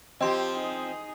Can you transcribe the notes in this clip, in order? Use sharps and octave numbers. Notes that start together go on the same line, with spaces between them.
F3 C4 G4 D#5 C6
D#4 G#4